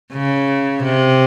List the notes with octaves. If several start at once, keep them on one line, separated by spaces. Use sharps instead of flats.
C#3
C3